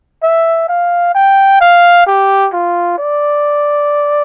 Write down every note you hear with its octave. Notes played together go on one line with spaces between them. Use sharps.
E5
F5
G5
F5
G4
F4
D5